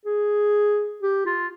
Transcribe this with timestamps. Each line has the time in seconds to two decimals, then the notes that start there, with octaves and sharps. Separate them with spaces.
0.06 G#4
1.02 G4
1.26 F4